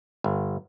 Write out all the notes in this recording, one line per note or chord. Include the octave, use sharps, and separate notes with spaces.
G1